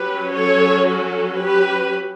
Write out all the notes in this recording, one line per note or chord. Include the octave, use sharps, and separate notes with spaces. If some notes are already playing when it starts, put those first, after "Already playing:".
Already playing: F#3 C#4 G4 B4
A4 C#5
F#4 A4
G4 B4